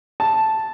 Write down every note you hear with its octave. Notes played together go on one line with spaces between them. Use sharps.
A5